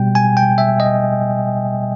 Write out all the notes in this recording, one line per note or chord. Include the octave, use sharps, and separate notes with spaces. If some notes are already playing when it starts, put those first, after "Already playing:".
Already playing: B2 G3 G5
G#5
G5
E5
D#5